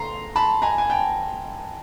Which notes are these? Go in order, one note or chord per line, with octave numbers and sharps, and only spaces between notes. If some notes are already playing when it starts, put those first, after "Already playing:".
Already playing: C#3 A3 A#5 C6
A5 B5
G#5 A#5
G#5
G5 A5